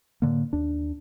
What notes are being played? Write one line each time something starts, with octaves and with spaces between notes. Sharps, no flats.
A2 D3 A#3
D#2 D4